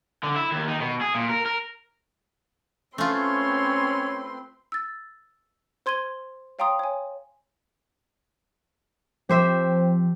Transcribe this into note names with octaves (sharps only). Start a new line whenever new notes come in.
D3
E4
D#2
D#3
B2
G#4
A#2
A#4
A#4
A3 C4 C#4 F4 B4 C#5 C6
E6 A6
C5 C6 G#6 D#7 G7
C#5 F5 G5 A#5 C6 D#6
C#5 G#5
F3 C4 G4 C5 E5